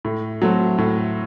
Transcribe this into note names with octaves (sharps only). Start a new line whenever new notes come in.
A2
F#3 A3 C4
A2